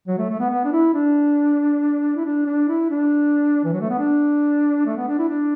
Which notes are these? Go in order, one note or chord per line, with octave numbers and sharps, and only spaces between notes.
F#3
A3
A3
B3
B3
D4
E4
D4
E4
D4
D4
E4
D4
E3
F#3
A3
B3
D4
A3
B3
D4
E4
D4